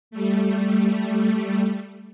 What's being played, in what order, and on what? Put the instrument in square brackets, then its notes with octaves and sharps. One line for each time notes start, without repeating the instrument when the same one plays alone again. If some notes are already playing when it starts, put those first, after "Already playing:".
[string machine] G3 A3